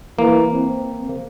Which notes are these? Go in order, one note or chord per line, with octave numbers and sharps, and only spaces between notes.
E3 A#3
C4